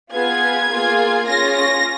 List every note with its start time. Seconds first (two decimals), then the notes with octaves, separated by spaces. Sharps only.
0.12 B3 F4 G#4 G#6
0.69 A#3 F4 G#4
1.26 C#4 F4 G#4 A#6
1.54 A#6